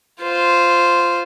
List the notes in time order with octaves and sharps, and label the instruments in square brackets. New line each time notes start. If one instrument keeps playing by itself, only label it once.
[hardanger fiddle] F4 C5